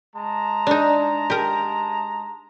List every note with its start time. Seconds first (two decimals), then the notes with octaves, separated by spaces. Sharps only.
0.15 G#3 A5 A#5
0.67 D4 D#4
1.30 G4 A#4